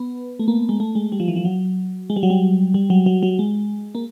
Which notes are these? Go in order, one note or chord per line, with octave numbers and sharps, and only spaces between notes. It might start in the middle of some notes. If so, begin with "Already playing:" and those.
Already playing: B3
A3
A#3
G#3
A3
G#3
G3
F3
E3
F3
F#3
G#3
G3
F#3
G3
G3
F#3
F#3
F#3
G#3
A#3